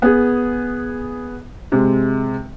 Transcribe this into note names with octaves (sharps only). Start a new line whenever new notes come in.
B3 G#4
C3 G#3